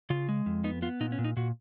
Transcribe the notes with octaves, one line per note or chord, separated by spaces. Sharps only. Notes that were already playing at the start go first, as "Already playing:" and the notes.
C#3 F4
G#3
F2
B3 D#4
B3 F4
A#2 D#4
C#4
A#2
D#4
A#2 F#4